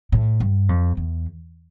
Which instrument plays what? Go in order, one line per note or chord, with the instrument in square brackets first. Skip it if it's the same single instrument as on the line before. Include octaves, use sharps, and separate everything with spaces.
[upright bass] A2
G2
F2
E2